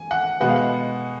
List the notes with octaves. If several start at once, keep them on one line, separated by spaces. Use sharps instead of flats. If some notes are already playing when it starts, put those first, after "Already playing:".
Already playing: G#5
F#5
B2 G#3 B3 F#5
F5
F#5